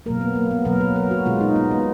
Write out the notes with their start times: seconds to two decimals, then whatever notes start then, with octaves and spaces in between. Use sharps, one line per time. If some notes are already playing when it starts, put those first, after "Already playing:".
0.06 B2 F#3 A#3 A#4
0.21 B3
0.36 A#3
0.51 B3
0.65 B2 F#3 A#3 A#4
0.81 B4
0.96 A#4
1.11 F#4
1.26 B2 G#3 F4
1.41 D#4
1.56 B3
1.71 B3